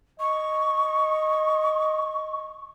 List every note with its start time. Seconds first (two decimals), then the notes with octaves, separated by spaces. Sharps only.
0.20 D#5 C#6